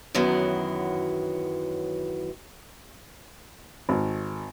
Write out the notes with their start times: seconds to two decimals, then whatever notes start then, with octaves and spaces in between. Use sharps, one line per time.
0.15 F#2 D#3 E3 F#3 B3
3.89 G#1